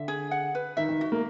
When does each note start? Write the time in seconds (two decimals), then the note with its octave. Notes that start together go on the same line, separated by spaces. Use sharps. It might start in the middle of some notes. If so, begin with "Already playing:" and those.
Already playing: D3 E5
0.08 G#4
0.31 F#5
0.55 B4
0.77 D#3 E5
0.89 D#3
1.01 F#4
1.12 A#3